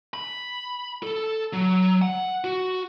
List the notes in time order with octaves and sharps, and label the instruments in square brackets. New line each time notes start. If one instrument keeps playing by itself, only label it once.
[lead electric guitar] B5
A4
F#3
F#5
F#4